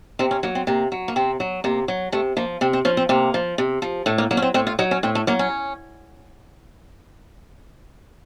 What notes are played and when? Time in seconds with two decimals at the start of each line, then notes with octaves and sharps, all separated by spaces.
0.19 C3 C4
0.31 C#4
0.43 F#3 A#3
0.55 C4
0.67 C3 A#3
0.92 F#3
1.08 A#3
1.16 C3 C4
1.40 F#3
1.64 C3 A#3
1.88 F#3
2.12 C3 A3
2.37 F3 A#3
2.61 C3 C4
2.73 C4
2.85 F3 C#4
2.97 C4
3.09 C3 A#3
3.34 F3
3.58 C3
3.82 F3
4.06 A2 A3
4.18 A#3
4.31 F#3 A#3
4.37 C#4
4.42 C4
4.54 A2 C4
4.67 F4
4.79 F#3 D#4
4.91 C#4
5.03 A2 C4
5.15 A3
5.27 F#3 A#3
5.39 C#4